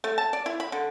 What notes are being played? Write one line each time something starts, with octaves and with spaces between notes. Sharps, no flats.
A3
A5
D5
E4
B5
D3